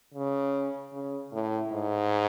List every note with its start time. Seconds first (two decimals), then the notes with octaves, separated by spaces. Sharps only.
0.14 C#3
0.93 C#3
1.33 A2
1.72 G#2